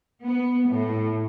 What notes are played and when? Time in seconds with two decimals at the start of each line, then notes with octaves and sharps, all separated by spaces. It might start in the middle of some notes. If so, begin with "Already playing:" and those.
0.23 B3
0.69 A2